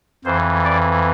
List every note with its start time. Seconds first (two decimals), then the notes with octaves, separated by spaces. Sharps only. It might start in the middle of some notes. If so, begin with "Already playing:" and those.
0.24 F2 E3 C5
0.64 D5